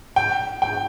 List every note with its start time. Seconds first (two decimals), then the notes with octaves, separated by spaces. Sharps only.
0.16 G5
0.62 G5